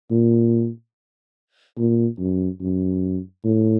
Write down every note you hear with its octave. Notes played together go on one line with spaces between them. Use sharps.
A#2
A#2
F#2
F#2
A2